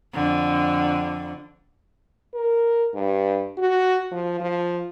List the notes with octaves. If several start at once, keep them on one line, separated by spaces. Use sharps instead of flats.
F2 D3
A#4
G2
F#4
F3
F3